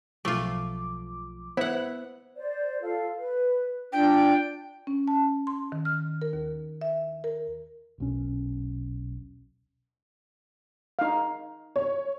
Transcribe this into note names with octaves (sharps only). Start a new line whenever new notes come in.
B1 F3 A3 F4 D6
B3 E4 C5 E5 F#5
C5 D5
F4 A4 F5
B4
D4 F4 D5 G5
C#4
A5
C6
D#3
F6
A#4
D#2
E5
A#4
D#1 B1 C#4
D#4 F5
C#5